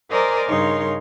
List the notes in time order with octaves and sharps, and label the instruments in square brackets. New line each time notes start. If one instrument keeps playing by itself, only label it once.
[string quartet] A#4 C5 D5 D#5 G#5 A#5
G2 C#3 D#4 A#4 C#5 C6